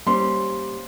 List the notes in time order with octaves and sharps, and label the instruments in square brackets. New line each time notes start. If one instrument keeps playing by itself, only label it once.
[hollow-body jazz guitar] G3 [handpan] A#3 C#4 C5 [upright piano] C6